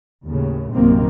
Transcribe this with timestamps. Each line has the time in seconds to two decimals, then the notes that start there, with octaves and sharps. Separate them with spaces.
0.24 D#2 A2 C#3
0.73 A#1 F#2 C3 D#3 A#3 C4